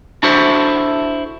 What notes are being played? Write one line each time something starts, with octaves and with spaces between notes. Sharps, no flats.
D4 E4 F#4 A4 C5 E5